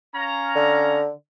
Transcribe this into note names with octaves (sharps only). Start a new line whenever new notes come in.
C#4 F5 A#5
D3